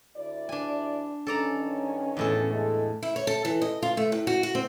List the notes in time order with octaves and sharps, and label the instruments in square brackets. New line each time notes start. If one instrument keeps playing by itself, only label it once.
[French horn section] D2 E4 D5
[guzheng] D4 G#5
[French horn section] G2 D#3 C#4 [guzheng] A4 D5 A#5
[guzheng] E2 A2 A4
[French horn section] G#3 A3
[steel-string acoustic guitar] E4
C#5
A4
E3
D#5
F4
A3
A2
F#4
F#4
C4